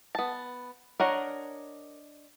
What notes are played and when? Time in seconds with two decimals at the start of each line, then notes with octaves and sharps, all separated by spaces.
0.15 B3 A5
1.00 D4 A#4 C#5 D#5 F#5